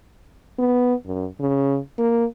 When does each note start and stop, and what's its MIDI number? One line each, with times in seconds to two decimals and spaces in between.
0.58 0.94 59
1.06 1.26 42
1.40 1.78 49
1.98 2.25 58